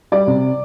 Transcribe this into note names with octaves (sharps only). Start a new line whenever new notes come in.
G3 D5
C3